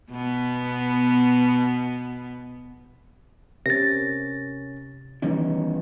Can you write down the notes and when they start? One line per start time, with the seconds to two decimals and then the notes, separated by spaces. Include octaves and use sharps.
0.11 B2 B3
3.66 C3 C#4 A#4 A6 A#6
5.22 D#3 E3 G3 B3 C#4